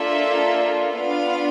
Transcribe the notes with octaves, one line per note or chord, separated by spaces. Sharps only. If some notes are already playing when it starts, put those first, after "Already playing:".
Already playing: A#3 D4 F4 A4 E5
B3 D4 F4 F5